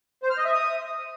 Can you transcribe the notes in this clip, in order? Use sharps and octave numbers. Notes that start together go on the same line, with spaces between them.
C5
F6
D#5
E5
D#6